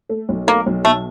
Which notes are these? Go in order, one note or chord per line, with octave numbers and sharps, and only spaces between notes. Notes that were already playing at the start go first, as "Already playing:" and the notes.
A3
B1
A3 A#3
B1
B2 A3